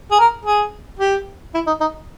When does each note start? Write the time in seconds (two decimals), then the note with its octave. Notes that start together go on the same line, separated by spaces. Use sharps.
0.11 G#4
0.19 A#4
0.45 G#4
0.99 G4
1.55 E4
1.67 D#4
1.81 D#4